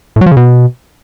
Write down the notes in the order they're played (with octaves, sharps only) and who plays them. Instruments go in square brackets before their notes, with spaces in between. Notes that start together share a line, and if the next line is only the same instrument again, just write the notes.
[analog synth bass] A2
F#3
F3
C#3
B2